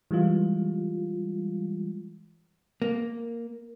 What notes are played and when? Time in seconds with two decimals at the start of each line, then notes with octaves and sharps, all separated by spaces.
0.11 E3 G3 G#3 F4
2.82 A#3